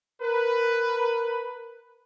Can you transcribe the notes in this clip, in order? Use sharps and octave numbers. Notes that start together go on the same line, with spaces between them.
A#4 B4